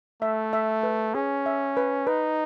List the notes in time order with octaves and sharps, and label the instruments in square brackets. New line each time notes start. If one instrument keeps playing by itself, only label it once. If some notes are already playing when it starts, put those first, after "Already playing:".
[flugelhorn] A3 [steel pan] E5
[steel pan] E5
B4
[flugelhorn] C#4 [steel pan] G#4
[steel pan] E5
B4
[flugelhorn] D#4 [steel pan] B4